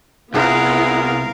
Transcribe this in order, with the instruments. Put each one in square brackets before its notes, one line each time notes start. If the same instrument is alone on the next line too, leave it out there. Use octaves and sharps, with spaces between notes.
[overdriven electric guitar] C2 [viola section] B3 E4 F4 [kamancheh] G#4 F#5 [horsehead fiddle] A#4 F5